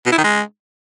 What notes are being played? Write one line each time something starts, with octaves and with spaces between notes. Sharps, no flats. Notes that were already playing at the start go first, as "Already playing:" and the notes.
B2
E4
D#3
G#3